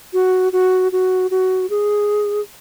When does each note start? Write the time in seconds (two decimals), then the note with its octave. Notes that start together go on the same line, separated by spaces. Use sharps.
0.14 F#4
0.53 F#4
0.92 F#4
1.31 F#4
1.70 G#4